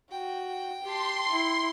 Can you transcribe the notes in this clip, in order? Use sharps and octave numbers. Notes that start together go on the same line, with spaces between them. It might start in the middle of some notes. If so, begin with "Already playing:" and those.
F#4 G5
G4 A5 C6
E4